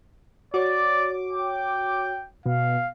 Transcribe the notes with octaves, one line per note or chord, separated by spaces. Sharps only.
F#4 C#5 D5 D6
G5
B2 F5